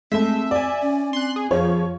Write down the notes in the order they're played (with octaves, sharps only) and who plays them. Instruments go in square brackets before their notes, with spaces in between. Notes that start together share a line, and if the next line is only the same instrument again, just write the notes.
[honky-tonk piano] G#3 A3 [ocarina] C4 [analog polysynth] E5
[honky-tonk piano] D5 G#5
[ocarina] C#4
[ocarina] C4 [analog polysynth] C6 F#6
[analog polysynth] G#4
[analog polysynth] F2 F3 [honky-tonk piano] F4 C#5 [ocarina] G#4